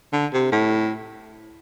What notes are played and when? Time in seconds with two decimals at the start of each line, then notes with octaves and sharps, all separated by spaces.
0.13 D3
0.33 C3
0.52 A2